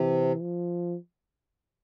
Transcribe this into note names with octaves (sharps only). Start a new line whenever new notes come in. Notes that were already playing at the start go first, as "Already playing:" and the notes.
Already playing: C3 E3
F3